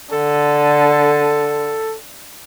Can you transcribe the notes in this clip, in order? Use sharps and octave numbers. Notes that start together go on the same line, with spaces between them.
D3 A4